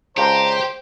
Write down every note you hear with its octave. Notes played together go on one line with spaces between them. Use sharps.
C#2 D4 G4 C5 F5 A#5